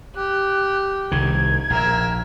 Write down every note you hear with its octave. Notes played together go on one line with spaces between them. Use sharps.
G4 F#6
C2 D#3 G#6
A#1 A#4 E5